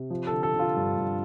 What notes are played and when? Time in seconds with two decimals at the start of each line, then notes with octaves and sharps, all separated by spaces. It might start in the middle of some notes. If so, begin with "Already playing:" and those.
Already playing: C3
0.10 F3
0.27 A4
0.32 D3
0.43 A4
0.54 D3
0.59 F4
0.76 G2
0.97 G2